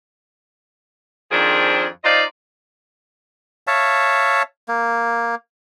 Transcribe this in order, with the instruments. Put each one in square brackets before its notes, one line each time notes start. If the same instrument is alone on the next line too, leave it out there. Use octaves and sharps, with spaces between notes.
[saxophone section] F2 D#3 F3 D4 G#4 A#4
D#4 F4 C5 D5 D#5 F5
[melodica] C#5 E5 F5 A5
A#3